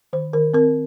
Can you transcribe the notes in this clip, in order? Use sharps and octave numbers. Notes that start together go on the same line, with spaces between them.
D#3 C5
D#3 A#4
C4 A#4